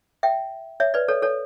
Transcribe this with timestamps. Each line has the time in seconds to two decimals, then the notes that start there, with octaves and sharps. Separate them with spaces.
0.23 E5 G5
0.80 C#5 E5
0.94 B4 D5
1.08 A4 C#5
1.22 A4 C#5